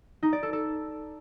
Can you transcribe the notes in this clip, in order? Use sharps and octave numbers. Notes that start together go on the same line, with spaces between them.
D#4
D5
A4
A4